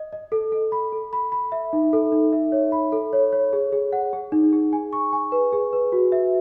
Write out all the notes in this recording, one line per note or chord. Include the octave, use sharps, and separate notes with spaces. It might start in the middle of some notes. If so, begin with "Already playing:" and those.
Already playing: D#5
D#5
A4
A4
B5
A4
B5
B5
E5
D#4
A4
D#4
E5
C#5
B5
A4
C#5
C#5
G#4
G#4
F#5
G#4
D#4
G#4
G#5
C#6
G#5
B4
G#4
B4
F#4
E5